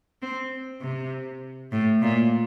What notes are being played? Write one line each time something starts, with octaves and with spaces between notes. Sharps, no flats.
C4
C3
A2
A#2